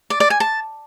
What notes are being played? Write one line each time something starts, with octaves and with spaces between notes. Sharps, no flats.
D5
D5
G#5
A5